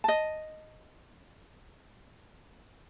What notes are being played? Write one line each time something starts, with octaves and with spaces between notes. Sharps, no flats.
D#5 A5